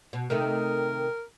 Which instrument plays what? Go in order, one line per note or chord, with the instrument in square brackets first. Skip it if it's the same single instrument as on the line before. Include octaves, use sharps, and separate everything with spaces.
[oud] B2
[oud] C3 D#3 A3 [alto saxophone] A#4